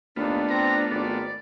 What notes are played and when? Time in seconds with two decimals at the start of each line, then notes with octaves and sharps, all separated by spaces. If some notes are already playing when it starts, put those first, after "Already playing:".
0.16 D#2 A3 B3 D4 F4
0.50 C4 A#5
0.91 G#1 D5